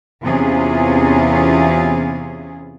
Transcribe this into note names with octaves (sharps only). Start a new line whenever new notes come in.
E2 C3 E3 C#4 F4 G#4